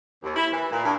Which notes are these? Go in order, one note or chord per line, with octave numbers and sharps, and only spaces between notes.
D#2
E4
E3
A#2
G2